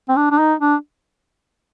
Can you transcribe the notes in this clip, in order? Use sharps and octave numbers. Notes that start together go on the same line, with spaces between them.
C4
D4
D4
D#4
D4